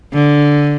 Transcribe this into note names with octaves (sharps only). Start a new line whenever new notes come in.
D3